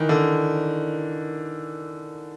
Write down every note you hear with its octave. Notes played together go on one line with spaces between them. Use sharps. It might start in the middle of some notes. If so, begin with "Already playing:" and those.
Already playing: D#3 E3
D3